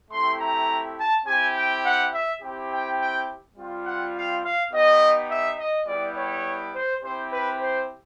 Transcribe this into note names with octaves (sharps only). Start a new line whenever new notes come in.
A3 C4 E4 G4 C6
A#5
A5
C4 E4 G4 G#5
G5
F#5
E5
C4 E4 G4
G5
G5
G3 C4 F4
F#5
F5
F5
B3 D#4 G4 D#5
E5
D#5
G3 B3 E4 G4 D5
C#5
C5
C4 E4 G4 C5
B4
C5